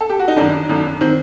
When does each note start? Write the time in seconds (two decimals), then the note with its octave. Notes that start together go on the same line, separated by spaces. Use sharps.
0.01 A4
0.10 G4
0.19 F#4
0.28 D#4
0.36 G1 F#2 D#3 D4
0.69 G1 F#2 D#3
1.01 D#3 C4